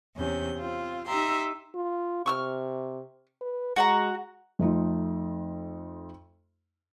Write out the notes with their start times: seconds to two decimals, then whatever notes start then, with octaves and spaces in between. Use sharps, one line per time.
0.16 E2 C3 C#4 G6
0.58 C4 F4
1.06 D#4 G4 E5 A#5 C6
1.75 F4
2.26 C3 C#6 E6 F6
3.41 B4
3.76 G#3 F#4 F#5 A#5
4.59 F2 A3 D#4 F4